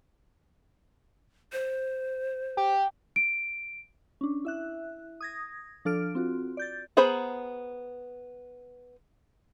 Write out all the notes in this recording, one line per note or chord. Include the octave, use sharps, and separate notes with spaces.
C5
G4
D7
C#4 D4
E4 E5 F#6
D#6 G#6 A#6
F3 D4 A4 F6 D7
C4 F4 F#4
D5 G6 A6
B3 G#4 C5 A#5 B5